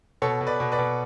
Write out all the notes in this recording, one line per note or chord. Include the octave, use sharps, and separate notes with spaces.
B2 A4 C#5
B2
B4 D5
B2
B4 D5
B2